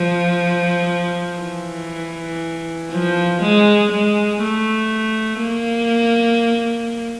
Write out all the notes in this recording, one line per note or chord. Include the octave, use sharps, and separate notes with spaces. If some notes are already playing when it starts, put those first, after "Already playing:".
Already playing: F3
E3
F3
G#3
G#3
A3
A#3